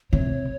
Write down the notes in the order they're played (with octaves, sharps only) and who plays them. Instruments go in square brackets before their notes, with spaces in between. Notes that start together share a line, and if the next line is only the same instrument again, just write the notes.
[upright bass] C3 [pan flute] C#5